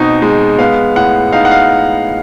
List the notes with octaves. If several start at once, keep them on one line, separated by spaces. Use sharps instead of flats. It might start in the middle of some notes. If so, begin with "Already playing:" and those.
Already playing: B2 C4 D#4
G#3
B3 F5
A2 F#5
D#4 F5
F#5
F5